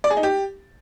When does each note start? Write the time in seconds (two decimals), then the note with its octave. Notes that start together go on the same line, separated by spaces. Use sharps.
0.04 D5
0.10 G#4
0.17 D#4
0.23 G4